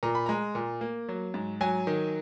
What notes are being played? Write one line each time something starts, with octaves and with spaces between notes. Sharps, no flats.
A#2 A#5
B5
G#3 A#5
A#2
A#3
F#3
G#2
F#3 G#5
D#3